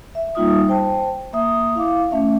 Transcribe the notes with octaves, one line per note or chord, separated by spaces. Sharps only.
E5
G3 A#3 D#4 F4 E5 D#6
C5 G5 A5
A#3 E5 D#6
E4 F5 D6
A3 C#4 E5